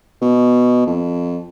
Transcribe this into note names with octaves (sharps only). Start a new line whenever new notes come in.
B2
F2